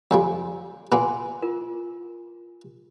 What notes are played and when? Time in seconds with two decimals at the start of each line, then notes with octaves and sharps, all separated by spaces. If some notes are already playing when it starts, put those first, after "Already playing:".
0.11 F2 F3 G3 G#5
0.92 A#2 A#3 B3 G#5 C6
1.42 F4 A#4